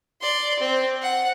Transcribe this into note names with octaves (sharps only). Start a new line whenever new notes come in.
D5 C6
C4
F#5